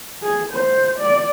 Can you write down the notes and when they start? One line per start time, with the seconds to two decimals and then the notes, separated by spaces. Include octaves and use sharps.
0.23 G#4
0.53 C5
0.99 D5